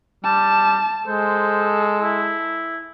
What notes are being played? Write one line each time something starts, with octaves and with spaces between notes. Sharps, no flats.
G3 A5
G#3 A4 C5
E4